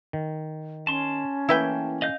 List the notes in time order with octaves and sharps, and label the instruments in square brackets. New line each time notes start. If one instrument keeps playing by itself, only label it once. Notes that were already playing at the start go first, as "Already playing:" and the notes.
[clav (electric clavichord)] D#3
[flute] C#4 [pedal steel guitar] A5 C6
[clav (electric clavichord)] E3 A3 A#3 [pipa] E4 B4 G5
[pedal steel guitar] D#5 F5 G6